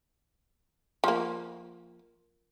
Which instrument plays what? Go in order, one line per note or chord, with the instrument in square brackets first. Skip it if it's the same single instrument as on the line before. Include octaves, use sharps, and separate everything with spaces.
[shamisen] F3 A#3